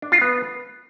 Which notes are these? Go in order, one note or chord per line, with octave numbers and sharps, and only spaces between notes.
D4
F4
B3